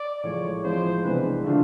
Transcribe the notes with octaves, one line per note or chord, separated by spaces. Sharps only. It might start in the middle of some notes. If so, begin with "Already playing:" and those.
Already playing: D5
A2 F3 G#3 C#5
F3 G#3 C4 E4 C5
C3 E3 G#3 B3 D4 B4
D3 F3 A3 D4 F4